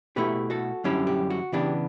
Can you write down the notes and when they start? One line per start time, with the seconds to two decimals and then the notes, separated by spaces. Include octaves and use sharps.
0.16 B2 A3 E4 G4 B4
0.50 F#4 A4
0.84 F#2 D3 G3 C#4 E4 G4
1.07 G4
1.30 F#4
1.52 C#3 E3 B3 D4 G4